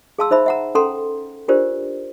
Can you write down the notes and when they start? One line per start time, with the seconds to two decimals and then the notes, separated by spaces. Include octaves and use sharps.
0.19 G#4 F5 A5 C6 E6
0.31 D#4 C5 E5 B5
0.46 E5 F#5 A#5
0.75 C#4 A4 F#5 G5 A#5 C6
1.48 D4 F4 G4 A#4 C5 D5